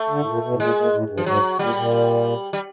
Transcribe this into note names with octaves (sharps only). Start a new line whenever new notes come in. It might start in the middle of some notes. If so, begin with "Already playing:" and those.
Already playing: A3
D3
A2
A#2
B2
A2
A#2 G#3
A#2
A2
G2
F3
G#2 F#3
A#2 G3
A#2
G3